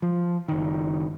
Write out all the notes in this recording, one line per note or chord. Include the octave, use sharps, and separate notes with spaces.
F3
F#1 D#3